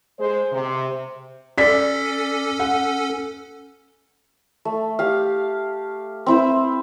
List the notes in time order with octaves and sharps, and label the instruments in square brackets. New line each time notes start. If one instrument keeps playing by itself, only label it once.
[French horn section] G#3 C5
C3
[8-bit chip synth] C#4 A4 [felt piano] D5 B6
[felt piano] F#5
[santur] A3
G4 F5
C4 E4 C5